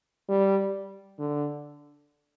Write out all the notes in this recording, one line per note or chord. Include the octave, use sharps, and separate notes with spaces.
G3
D3